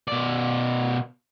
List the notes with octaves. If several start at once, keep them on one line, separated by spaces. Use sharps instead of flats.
B2 D5